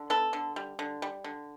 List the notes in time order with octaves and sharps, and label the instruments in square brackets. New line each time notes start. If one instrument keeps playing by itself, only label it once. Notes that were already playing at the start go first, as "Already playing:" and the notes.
Already playing: [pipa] D3
B3 A4
D3
G3
D3
G3
D3